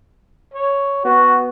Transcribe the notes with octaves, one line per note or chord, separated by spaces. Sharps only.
C#5
B3 F#4